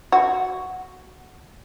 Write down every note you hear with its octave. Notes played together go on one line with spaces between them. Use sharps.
F#4